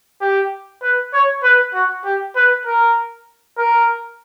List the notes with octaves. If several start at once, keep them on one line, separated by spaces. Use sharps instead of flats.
G4
B4
C#5
B4
F#4
G4
B4
A#4
A#4